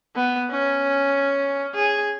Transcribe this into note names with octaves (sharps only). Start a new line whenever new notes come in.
B3
C#4
G#4